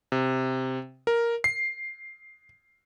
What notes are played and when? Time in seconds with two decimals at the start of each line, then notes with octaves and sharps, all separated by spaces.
0.12 C3
1.07 A#4
1.44 C7